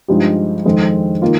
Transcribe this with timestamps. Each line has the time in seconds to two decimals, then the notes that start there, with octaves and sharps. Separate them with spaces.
0.08 G2 F3 G#3 D#4 G4
0.65 F2 D#3 G#3 C4
1.22 D#3 A#3 F4